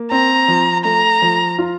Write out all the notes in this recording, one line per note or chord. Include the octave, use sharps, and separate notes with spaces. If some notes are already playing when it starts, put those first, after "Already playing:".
Already playing: A#3
C4 A#5
F3
A3 A#5
F3
F4